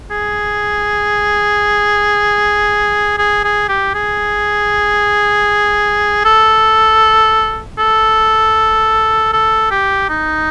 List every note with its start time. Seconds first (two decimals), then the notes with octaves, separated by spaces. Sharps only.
0.11 G#4
3.18 G#4
3.44 G#4
3.69 G4
3.94 G#4
6.25 A4
7.78 A4
9.33 A4
9.71 G4
10.09 D#4